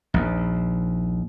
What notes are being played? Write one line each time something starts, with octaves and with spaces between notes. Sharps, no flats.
A#1 D#2